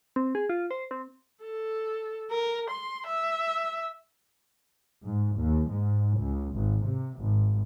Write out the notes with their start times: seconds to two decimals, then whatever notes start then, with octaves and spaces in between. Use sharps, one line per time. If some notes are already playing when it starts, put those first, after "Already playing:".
0.16 C4
0.35 G#4
0.50 F4
0.71 C5
0.91 C4
1.45 A4
2.31 A#4
2.70 C6
3.07 E5
5.04 G#2
5.38 D#2
5.69 G#2
6.18 C#2
6.55 G#1
6.85 C3
7.19 G#1